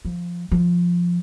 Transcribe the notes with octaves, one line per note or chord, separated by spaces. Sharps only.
F3
F3